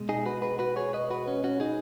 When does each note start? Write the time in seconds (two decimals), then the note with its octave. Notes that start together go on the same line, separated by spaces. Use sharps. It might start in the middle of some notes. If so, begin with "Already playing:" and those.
Already playing: B2 G#3
0.09 D#4 G#4
0.26 F#4 B4
0.42 F#4 B4
0.59 F#4 B4
0.76 G#4 C#5
0.93 B4 D#5
1.10 F#4 B4
1.27 C#4
1.44 C#4 F#4
1.60 D#4 G#4